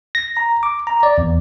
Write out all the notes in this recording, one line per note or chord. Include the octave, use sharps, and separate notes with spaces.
A#6
A#5
D6
A#5
D5
E2